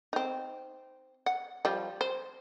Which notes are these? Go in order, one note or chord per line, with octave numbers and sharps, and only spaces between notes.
C4 D#4
F#5
F3 G3
C5